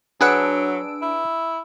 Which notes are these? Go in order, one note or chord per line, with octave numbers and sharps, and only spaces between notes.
F#3 D4 G#4 B4 F#5 E6 D7
E4